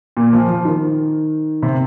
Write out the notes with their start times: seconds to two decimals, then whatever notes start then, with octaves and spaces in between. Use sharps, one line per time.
0.17 A#2
0.33 F3
0.49 F3
0.65 D#3
1.62 C3